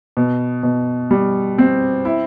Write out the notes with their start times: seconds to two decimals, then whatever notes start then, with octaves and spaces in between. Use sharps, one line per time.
0.17 B2
0.63 B2
1.11 G3
1.58 C4
2.05 E4